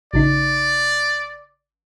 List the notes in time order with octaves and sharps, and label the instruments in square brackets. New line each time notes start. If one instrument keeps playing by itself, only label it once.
[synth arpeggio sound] A1 C#3 D#4 [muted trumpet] D5